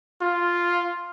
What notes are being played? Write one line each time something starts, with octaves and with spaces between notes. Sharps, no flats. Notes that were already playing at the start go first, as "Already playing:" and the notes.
F4